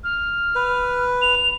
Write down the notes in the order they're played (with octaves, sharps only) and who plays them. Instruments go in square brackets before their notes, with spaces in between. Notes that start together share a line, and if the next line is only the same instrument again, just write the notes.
[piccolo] F6
[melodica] B4
[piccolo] F7